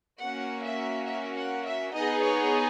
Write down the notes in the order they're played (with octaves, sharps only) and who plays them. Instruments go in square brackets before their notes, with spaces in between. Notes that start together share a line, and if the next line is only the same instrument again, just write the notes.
[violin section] A#3 C#4 F#4 F#5
E5
E5
F#5
E5
B3 D#4 G#4 D#5
C#5